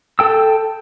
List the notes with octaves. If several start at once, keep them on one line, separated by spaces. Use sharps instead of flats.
A4 G5 E6